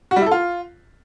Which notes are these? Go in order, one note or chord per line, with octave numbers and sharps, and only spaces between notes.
F#4
G3
E4
A4
F4